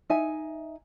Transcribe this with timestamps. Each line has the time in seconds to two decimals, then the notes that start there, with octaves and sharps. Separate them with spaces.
0.10 D#4 E5 G#5